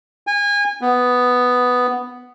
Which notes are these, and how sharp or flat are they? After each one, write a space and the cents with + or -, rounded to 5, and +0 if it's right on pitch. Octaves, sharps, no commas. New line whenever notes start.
G#5 -30
B3 +5